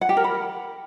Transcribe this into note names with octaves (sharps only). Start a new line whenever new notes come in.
F#5
G4
A#4
B5